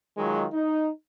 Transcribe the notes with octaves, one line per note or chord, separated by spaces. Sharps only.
D#3 F#3 G#3 F4
D#4